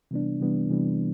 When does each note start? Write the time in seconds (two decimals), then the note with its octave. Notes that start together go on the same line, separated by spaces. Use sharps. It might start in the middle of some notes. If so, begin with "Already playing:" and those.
0.11 C3 E3 G3 B3 D4
0.40 C3 E3 G3 B3 D4
0.70 C3 E3 G3 B3 D4